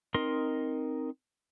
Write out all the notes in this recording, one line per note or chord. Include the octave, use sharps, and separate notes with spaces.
C4 D#4 A#4 D#5 C6